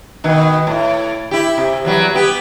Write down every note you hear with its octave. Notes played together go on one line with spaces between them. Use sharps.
B2 D#3
A2
E4 G4
C3
E2 F#3 G3
B3 G4